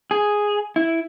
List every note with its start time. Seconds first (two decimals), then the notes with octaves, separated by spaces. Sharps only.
0.11 G#4
0.76 E4